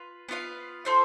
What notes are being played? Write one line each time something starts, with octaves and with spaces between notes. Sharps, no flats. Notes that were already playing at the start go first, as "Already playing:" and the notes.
Already playing: F4 B4
B3 F4 B4 F5
F4 A4 C5 E5